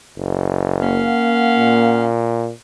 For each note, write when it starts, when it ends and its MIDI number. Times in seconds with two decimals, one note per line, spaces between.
0.17 1.10 30
0.81 2.07 58
0.81 2.06 61
0.81 2.06 77
0.81 2.06 78
1.58 2.51 46